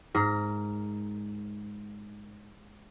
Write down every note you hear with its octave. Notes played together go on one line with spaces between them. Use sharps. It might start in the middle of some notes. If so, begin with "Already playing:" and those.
G#2 A#4